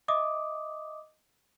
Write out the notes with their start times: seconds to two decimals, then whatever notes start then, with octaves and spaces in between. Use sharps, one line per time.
0.08 D#5 E5 D6 D#6